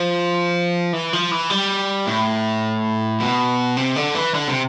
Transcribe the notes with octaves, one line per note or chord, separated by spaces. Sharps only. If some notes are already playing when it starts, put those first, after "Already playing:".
Already playing: F3
E3
F3
E3
G3
A2
B2
C3
D3
E3
D3
C3